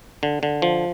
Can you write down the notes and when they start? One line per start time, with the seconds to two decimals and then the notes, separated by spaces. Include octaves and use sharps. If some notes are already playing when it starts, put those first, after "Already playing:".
0.23 D3
0.43 D3
0.62 F3